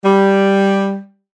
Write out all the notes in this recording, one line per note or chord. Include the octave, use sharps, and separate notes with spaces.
G3